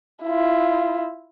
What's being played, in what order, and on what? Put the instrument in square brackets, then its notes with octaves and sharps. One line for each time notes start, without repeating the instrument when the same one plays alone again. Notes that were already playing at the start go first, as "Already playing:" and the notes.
[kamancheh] E4 F4